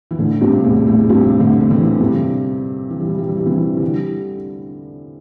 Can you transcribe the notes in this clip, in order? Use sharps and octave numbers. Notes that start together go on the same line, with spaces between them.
E3
A2 D3
G2 C3
E2 A2
E2 A2
G2 C3
A2 D3
D3
C3 E3
G2 C3
E3
G3
E3
G3
E3
G3
C3 E3
E3
D3 G3